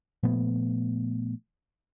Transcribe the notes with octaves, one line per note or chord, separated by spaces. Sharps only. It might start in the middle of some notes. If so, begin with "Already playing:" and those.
A#2 F3 A3 B3